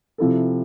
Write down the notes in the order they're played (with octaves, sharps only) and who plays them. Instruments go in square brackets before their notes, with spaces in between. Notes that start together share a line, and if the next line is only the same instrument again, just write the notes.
[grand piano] C3 F3 C4 E4 A4